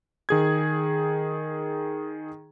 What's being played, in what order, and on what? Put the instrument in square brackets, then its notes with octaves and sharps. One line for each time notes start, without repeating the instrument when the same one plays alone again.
[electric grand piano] D#3 G#4 G#6